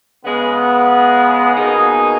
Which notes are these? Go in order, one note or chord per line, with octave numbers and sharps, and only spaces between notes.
C#3 G#3 B3
B2 A#3 D#4 G#4